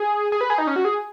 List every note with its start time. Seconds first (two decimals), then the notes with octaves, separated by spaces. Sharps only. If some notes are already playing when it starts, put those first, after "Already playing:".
Already playing: G#4
0.32 G#4
0.41 B4
0.50 G#4
0.58 D#4
0.67 C#4
0.76 F#4
0.85 G#4